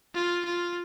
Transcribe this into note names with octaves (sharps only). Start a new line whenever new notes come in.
F4
F4